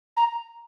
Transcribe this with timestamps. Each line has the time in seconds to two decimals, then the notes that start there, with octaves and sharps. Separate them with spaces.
0.17 A#5